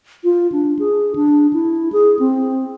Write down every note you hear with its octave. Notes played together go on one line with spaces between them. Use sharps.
F4
D4
G#4
D4
E4
G#4
C4